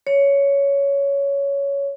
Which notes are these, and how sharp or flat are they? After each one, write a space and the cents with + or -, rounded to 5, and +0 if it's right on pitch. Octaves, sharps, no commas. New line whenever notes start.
C#5 +10